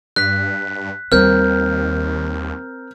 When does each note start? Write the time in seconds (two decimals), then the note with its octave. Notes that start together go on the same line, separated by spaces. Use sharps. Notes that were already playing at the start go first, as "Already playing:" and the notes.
0.16 G2 F#6 B6
1.12 D#2 G3 C4 A#4 F6 G6